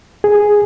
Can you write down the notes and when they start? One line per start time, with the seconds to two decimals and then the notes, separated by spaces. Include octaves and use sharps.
0.24 G#4